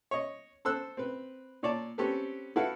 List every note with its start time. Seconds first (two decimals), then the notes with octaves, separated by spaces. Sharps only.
0.11 C#5 D#5
0.65 A4 C5 E6 F#6
0.97 C4 B4
1.63 A#2 C#5 D5 A5
1.98 C4 C#4 G4 A4 B4
2.56 E4 F#4 A4 B4 F5 F#5